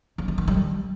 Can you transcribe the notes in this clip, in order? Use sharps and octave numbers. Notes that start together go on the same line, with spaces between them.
D3
A3
D#3
G3